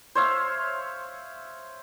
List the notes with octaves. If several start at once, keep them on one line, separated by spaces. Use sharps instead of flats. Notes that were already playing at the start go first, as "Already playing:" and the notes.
C5 C#5 E5 F5